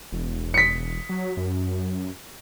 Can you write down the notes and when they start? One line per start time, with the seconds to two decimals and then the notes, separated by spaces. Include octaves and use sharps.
0.12 E1
0.54 B6 C#7
1.09 F#3
1.37 F#2